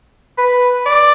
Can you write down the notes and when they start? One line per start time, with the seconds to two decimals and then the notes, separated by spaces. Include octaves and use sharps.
0.38 B4
0.86 D5